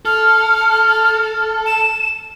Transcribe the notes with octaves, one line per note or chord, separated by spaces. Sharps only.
A4 F6
E7